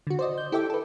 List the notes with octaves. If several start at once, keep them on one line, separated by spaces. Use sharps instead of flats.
D3 F#4
C5 D5 D#5
G6
E4 G4 A4 E5 G5 D6
A4 B4